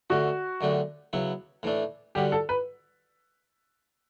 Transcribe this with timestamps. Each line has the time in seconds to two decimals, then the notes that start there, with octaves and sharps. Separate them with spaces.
0.10 D3 A3 C#4 F#4
0.61 F#2 D3 A3 D4 G4
1.13 C#3 F#3 B3 E4
1.63 A2 E3 A3 D4
2.15 D3 G3 C#4 F#4 G4
2.32 A4
2.49 B4